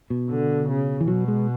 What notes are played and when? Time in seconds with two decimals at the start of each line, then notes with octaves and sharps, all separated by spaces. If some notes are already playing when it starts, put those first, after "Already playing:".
0.10 B2
0.29 D3
0.69 C#3
1.00 E3
1.08 B2 F#3
1.28 G#3